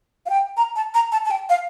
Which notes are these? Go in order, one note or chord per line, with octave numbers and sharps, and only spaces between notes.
F5
G5
A#5
A5
A#5
A5
A5
G5
F5